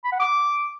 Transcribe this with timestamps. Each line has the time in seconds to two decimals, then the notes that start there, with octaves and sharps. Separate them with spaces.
0.05 B5
0.12 F#5
0.20 D6